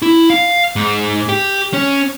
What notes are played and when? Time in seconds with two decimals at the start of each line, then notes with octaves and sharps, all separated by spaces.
0.02 E4
0.30 F5
0.76 G#2
1.29 G4
1.73 C#4